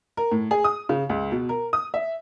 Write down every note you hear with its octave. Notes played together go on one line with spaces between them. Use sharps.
A#4
A2
G#4
D#6
C#3
C#2
B2
A#4
D#6
E5